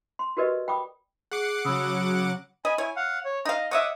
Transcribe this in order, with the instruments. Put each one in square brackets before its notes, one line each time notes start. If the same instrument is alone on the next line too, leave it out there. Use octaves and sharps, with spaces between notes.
[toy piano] C6
F#4 G4 A#4 B4 D5 D#5
G5 B5 D6 D#6
[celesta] G#4 [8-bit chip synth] F#5 D6 [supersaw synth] C7
[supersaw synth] C#3 F#3 [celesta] B5 D#6 E6
[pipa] D#5 [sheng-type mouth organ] G#5 B5
[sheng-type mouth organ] E4 G#5 [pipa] C#5
[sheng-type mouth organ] F5 F#5
C#5
[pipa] D#4 F5 [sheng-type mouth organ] D#5
[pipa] C#5 D#5 E5 [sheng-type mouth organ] F#5 D6 D#6